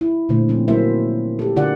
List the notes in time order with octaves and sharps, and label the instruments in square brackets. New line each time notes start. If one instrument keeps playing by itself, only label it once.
[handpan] E4
A#2 D3 A3 C5
F3 C4 C#4
F#3 A#3 E4 C5 E5
G4 A4
D3 F4 A#4 D5 F#5